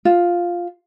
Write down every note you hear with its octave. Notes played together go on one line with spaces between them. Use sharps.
F4